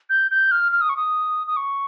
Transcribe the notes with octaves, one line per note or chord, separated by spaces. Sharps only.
G6
G6
F6
F6
D#6
C#6
D#6
D#6
C#6